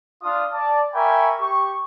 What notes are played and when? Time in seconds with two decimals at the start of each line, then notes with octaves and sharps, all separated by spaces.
0.23 D4 F4 D#6
0.53 D5 A5
0.94 A#4 E5 G5 G#5 B5 C#6
1.40 G4 C#6